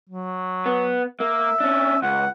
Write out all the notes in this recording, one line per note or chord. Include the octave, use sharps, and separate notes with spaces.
F#3
B3
A#3 E5
C#4 D4
C#2 F#5